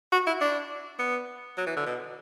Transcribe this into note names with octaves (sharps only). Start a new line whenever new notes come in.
F#4
E4
D4
B3
F#3
E3
D3
B2